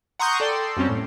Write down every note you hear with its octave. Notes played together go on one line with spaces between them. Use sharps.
F#5 A#5 C6 C#6 D#6 G6
A4 D5 G5 C6
F#2 G3 C4 C#4
A2